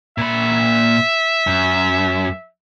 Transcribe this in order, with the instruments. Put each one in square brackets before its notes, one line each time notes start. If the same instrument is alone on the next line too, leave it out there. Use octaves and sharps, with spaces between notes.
[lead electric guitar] A#2 B5 [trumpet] E5
[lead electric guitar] F#2